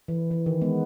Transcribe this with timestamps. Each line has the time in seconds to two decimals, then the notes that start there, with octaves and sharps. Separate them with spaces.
0.08 E3
0.31 E3
0.46 D#3
0.61 G#3 B3